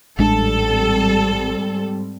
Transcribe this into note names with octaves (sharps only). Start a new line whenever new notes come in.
A1 G#2 G3 G#3 C4 D4 A4